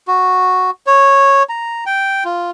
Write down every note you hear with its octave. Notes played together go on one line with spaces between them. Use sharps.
F#4
C#5
A#5
G5
F4